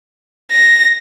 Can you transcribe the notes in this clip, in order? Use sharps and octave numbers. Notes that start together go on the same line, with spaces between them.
A#6